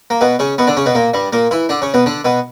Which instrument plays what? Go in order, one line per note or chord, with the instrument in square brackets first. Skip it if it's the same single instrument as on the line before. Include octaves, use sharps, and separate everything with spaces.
[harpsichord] A#3
B2 B3
C#3 C#4
B2 B3
D3 D4
C#3 C#4
B2 B3
A#2 A#3
G2 G3
A#2 A#3
E3 E4
D3 D4
C#3 C#4
B2 B3
D3 D4
B2 B3